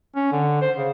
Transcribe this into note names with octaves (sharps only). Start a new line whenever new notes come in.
C#4
D3
C5
C#3